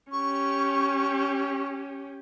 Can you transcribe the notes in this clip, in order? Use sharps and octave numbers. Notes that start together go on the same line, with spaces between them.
C#4 G4 C#6